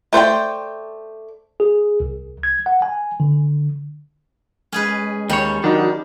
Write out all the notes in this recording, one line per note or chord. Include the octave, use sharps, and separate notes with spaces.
A3 C5 D5 G5
G#4
C2
G#6
F#5
G#5
D3
G#3 C#4 G#4 B4
D#2 G3 C#5
D#3 F#3 D4 D#4 F#4